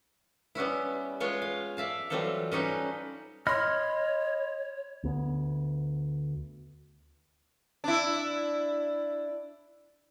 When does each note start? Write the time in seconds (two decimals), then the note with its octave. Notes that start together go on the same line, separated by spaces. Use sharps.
0.55 G3 B3 C#4 E4
1.20 G#3 B3 F4 C#5 G#5
1.42 F5
1.77 D5 E5 F5 A5
2.10 E3 F#3 G3 C4 F4 A4
2.52 G3 C#4 D#4 B4 C5
3.47 C#5 D#5 B5 C6 F6
5.04 D2 B3
7.84 D4 E4